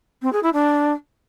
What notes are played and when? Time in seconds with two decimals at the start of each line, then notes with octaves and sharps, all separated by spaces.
0.22 C4
0.32 G#4
0.43 E4
0.53 D4